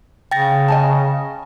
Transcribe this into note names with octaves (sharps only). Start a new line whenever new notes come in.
C#3 G5 A6 A#6
D#5 G#5 A5